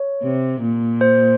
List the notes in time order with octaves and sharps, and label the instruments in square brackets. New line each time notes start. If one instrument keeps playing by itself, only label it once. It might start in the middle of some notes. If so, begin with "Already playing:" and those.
Already playing: [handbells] C#5
[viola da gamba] C3
A#2
[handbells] C5